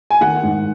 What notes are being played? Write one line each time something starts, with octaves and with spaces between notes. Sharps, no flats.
G#5
D#3 F#5
G#2